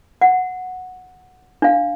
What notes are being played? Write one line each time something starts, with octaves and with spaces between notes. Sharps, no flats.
F#5
D4 F5